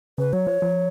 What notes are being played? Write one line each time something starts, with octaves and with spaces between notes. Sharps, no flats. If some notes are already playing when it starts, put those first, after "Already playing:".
C#3 B4
F#3 C#5
F3
F3